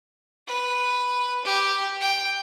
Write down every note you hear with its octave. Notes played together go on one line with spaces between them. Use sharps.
B4
G4
G5